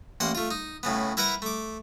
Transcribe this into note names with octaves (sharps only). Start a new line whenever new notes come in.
A1 A#3 F#5 C6
A3 F4
D#4
A2 C#3 B3
E4 A#4 B4 F#5 A#5
A3 D6